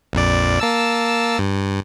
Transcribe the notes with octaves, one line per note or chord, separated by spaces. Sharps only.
A#1 F2 D5
A#3 A5 E6
G2